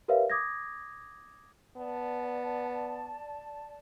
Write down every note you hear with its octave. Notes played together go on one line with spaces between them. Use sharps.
G4 A#4 B4 C#5 E5 F5
D6 D#6 G#6 A#6
B3 D5 A5